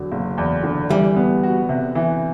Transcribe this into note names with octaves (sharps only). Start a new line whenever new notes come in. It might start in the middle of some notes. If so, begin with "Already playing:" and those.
Already playing: E2 D3 F#3
F#1
E2
D3
E3 G3
B3
F#4
C3
E3